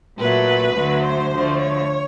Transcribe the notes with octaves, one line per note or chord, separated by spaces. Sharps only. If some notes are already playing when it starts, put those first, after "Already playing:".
A#2 F#3 A3 B4
D2 D3 F#3 A3
C5
D2 D3 F3 A3
C#5